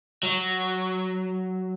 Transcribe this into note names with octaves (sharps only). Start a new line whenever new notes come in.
F#3